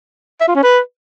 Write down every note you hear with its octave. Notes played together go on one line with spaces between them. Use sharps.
E5
F4
C#4
B4